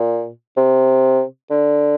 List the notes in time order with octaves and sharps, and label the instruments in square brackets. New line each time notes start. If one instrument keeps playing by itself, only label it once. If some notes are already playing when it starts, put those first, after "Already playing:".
Already playing: [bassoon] A#2
C3
D3